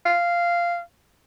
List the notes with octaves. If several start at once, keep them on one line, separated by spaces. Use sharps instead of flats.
F5